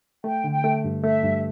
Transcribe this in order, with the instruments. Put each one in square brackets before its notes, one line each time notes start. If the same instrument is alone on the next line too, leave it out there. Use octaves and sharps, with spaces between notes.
[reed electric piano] A3 [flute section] G5
[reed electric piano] D3
[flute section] G5
[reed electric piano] A3
G2
[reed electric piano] A3 [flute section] E5
[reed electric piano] G2